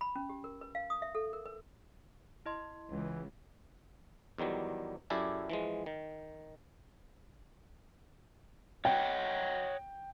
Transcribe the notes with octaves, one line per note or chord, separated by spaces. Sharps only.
B5
C#4
G4
A#4
B4
F5
D#6
E5
A4
A#4
B4
E4 D#5 C6
C#2 E3
E2 D#3 F#3 G3
F#2 E4 G4 A4 D5 G#5
E3 F3 G#3
D#3
C#5 D#5 F#5 G5